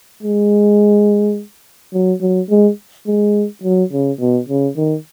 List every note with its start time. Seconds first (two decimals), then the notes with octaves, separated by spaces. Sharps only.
0.23 G#3
1.93 F#3
2.21 F#3
2.50 G#3
3.07 G#3
3.64 F#3
3.92 C#3
4.20 B2
4.49 C#3
4.76 D#3